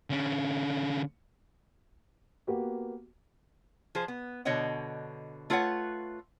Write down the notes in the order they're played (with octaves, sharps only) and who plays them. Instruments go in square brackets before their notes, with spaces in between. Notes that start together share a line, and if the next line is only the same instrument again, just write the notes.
[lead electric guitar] D3 C#4
[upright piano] A#3 B3 F#4 G4
[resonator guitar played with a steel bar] F3 G#4 C5
B3
B2 D3 C#5 D#5 F#5
A3 F4 B4 C#5 F5 F#5